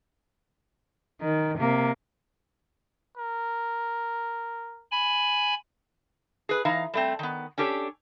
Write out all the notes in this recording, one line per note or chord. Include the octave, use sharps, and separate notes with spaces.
D#3
C3 A#3
A#4
G#5 B5
G#4 B4
E3 D#4 F5 A#5
G3 A3 C4
D#3 B3
C#4 D4 G4 A4 C#5